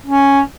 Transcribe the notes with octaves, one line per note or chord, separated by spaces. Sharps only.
C#4